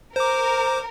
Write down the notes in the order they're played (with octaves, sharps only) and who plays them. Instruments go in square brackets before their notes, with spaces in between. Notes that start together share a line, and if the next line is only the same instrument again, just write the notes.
[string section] A#4 [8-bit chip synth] C5 D6